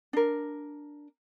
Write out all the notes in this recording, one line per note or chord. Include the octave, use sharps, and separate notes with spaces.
D4 A#4